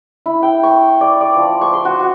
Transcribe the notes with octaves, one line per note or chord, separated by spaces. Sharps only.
E4
G5
C#6
D5
D5
F3
C#6
C6
F#4
F#4